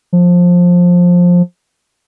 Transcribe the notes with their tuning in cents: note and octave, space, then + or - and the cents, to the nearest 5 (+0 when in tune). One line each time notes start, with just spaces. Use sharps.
F3 +15